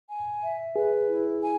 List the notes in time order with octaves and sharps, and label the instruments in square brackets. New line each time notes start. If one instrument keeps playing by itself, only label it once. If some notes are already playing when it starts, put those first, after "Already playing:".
[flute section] G#5
E5
[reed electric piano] G#4 [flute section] B4
[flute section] E4
G#5